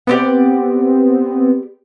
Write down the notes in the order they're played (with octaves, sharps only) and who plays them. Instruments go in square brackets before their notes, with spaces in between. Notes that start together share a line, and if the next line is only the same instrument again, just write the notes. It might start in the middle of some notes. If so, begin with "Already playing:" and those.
[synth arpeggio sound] B3 C4 [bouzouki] G4 D5 F#5